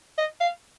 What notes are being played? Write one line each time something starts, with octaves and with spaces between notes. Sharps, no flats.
D#5
F5